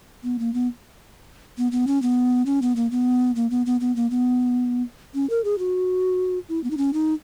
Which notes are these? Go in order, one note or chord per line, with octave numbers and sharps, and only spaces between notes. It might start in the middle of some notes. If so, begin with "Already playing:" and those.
B3
A#3
B3
B3
B3
C#4
B3
C#4
B3
A#3
B3
A#3
B3
B3
B3
A#3
B3
C#4
A#4
G#4
F#4
E4
B3
D#4
C#4
D#4